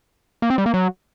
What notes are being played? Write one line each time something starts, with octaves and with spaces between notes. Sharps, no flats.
A#3
C4
G3
A#3
F#3